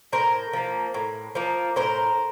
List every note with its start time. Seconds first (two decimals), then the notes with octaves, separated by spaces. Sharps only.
0.12 A2 A#4 C5
0.53 F3 A#3
0.94 A2
1.35 F3 A#3
1.76 A2 A#4 C5